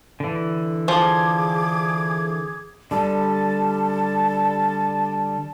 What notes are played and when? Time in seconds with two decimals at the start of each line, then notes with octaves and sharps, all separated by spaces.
0.20 D3 E3
0.88 F3 G#4 D6 G#6
2.91 D3 G3 A5